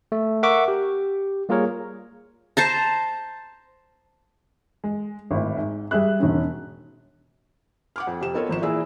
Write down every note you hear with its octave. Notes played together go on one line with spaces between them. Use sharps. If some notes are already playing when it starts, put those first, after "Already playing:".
A3
A#4 E5 F#5 C#6 D6
G4
G3 A#3 F4 G#4 A#4 C#5
C5 A5 A#5
G#3
G#1 A2
G#2
G3 G#4 E5 F#6
E1 D#3 C#4
F#5 D6 F6
F2
F2 C3 E7
B3 D#4 F4 A4 A#4 C#5
G#1 F3 E7
A#2 E3 E4 G#4 D5 E6